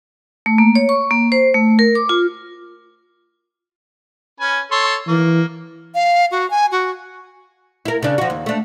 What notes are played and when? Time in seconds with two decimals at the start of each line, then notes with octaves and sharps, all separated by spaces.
0.46 A3
0.58 A#3
0.75 C#5
0.89 C#6
1.11 A#3
1.32 C5
1.54 A3
1.79 A#4
1.95 D6
2.09 F4
4.40 C#4 B4 G#5
4.71 A4 C#5 C6
5.08 E3 A#3
5.94 F5
6.31 F#4
6.50 G#5
6.71 F#4
7.85 E4 A#4
8.03 C#3 D4
8.18 F3 F#4
8.30 D#2
8.46 A3 D4